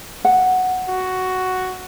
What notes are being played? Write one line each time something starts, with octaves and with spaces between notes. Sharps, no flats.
F#5
F#4